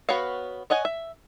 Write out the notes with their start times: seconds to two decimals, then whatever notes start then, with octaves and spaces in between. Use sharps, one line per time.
0.09 B3 F#4 B4 C#5 F5
0.70 C#5 D#5 F#5 G#5
0.85 E5